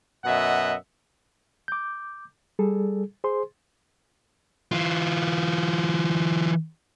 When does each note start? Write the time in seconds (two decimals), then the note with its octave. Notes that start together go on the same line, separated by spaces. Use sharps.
0.25 F#2 B2 D#5 E5 F#5
1.68 D6 G6
2.59 G3 G#4 A4
3.24 G#4 C5 C6
4.72 E3 F4